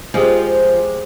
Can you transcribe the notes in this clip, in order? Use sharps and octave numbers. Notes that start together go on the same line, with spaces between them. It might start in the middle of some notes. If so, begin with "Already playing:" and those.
F3 G#3 G4 G#4